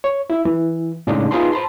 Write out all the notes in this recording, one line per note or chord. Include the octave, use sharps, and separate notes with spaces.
C#5
E4 E5
E3
A2 C#3 G#3 D4 D#4
D#4 F4 G#4 B4 A5 C6
C5 A5 B5 C6